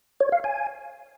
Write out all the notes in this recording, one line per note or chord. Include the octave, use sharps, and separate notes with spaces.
C#5
F5
G#5